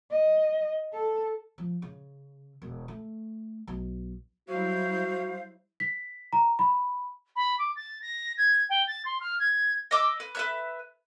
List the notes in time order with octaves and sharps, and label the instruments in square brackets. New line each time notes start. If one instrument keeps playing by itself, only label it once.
[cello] D#5
A4
[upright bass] F3
C#3
E1
A3
B1
[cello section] F#3 G3 E4 [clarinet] F#4 [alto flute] C5 [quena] F5
[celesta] B6
A#5
B5
[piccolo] B5
D6
A6
A#6
G#6
G5
A6
C6
F6
G#6
[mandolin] D#5 D6 E6
B4
B4 E5 F#6